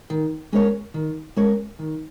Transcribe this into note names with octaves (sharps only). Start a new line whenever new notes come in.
D#3
G#3 C#4 A#4 C#5
D#3
G#3 C#4 A#4 C#5
D#3